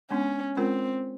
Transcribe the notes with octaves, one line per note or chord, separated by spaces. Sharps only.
G#3 B3 C#4 D4
G#3 C4 C#4 F4 A#4